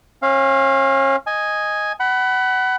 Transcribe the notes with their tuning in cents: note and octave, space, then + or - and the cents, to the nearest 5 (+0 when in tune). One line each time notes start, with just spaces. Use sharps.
C#4 -35 F5 +0
D#5 +0 G#5 +0
F#5 +25 B5 +0